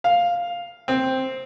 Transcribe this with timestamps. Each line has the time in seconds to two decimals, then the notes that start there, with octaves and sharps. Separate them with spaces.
0.04 F5
0.88 C4